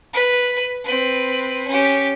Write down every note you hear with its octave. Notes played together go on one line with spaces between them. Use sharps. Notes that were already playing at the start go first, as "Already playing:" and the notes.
B4
C4 B4
C#4 G4